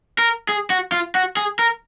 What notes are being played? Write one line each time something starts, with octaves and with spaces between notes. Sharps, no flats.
A#4
G#4
F#4
F4
F#4
G#4
A#4